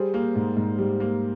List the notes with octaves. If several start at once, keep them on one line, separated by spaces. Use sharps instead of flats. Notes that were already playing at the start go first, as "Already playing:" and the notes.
Already playing: G3 G#4 C5
A#3
G#2
G#2
G3
A#3